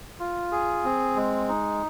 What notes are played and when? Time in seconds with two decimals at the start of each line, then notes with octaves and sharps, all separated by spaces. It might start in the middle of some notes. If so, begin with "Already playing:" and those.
0.20 F4
0.52 G#4
0.85 C4
1.16 G#3
1.49 D#4